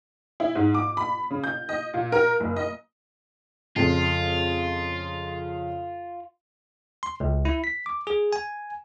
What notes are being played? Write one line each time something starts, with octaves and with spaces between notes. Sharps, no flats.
E4
G#2
D6
B5
C#3
G6
D#5
A#2
A#4
F#1
D#5
F2 C#3 F4
C6
C#2
E4
B6
D6
G#4
G#5